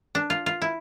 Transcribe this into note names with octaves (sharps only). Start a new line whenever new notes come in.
D4
F4
F4
E4